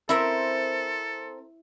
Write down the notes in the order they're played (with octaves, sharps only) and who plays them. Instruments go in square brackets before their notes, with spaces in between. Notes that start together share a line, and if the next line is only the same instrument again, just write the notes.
[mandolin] C4 A#4 C5 [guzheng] E4 E5 [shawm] A4